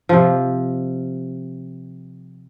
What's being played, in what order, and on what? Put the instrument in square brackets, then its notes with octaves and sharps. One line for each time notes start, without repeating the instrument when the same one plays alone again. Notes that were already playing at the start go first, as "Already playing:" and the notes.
[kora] C3 F3